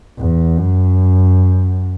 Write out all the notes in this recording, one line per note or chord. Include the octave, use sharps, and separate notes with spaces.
E2
F#2